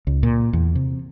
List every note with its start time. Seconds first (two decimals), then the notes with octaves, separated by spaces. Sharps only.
0.07 C#2
0.23 A#2
0.53 E2
0.75 C3